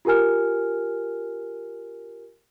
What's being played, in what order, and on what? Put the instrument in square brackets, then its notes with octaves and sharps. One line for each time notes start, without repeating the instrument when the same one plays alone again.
[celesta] F4 G4 A#4 G#5 F6